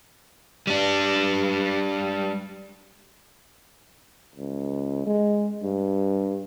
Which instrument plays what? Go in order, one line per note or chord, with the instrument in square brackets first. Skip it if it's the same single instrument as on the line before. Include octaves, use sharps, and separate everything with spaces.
[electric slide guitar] G3 D4
[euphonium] C#2
G#3
G2